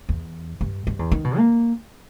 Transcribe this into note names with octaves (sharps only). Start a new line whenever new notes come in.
E2
G2
G2
E2
D#3
B2
A#3